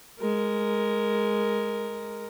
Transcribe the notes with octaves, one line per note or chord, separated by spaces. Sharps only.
G#3 A#4